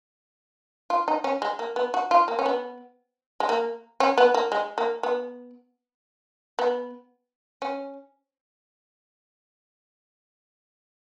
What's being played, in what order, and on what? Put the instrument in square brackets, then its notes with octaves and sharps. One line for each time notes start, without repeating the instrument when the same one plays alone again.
[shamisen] F4
D#4
C#4
G#3
A#3
B3
F#4
F4
A#3
C#4
B3
G#3
A#3
C#4
B3
A#3
G#3
A#3
B3
B3
C#4